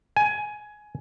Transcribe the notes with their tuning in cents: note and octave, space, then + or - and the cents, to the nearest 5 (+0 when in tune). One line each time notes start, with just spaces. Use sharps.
G#5 +15